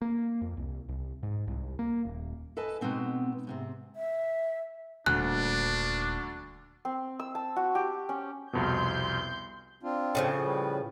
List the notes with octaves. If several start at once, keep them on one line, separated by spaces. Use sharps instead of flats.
A#3
F2
C2
C2
G#2
C2
A#3
D#1
A4 B4 D#5 G#5 A5
B2 G#3 B3 C4 D#4
G#2 C3 C4
E5
D#1 D2 D4 F#6
C4
E6
A5
F#4
G4
C#4
C2 F2 B2 C6 G6
C4 D4 F4
A2 C#3 F3
G3 B4